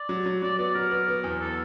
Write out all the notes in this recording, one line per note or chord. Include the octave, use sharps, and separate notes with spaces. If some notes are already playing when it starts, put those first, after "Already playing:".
Already playing: D5
F#3
F#3
F#3 D5
B3 D5
F#3 A#4
B3
B3
E2
A4